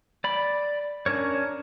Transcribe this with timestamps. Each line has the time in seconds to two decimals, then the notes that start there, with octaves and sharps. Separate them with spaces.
0.24 D5 B5
1.06 C#4 D4 A#4 C#5